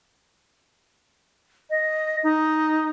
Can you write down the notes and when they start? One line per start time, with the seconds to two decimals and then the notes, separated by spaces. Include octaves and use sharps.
1.70 D#5
2.23 D#4